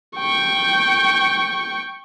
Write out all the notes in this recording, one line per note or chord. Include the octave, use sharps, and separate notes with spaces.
G5 C#6